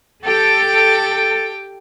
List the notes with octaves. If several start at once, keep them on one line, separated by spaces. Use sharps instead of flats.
G4 A4 G5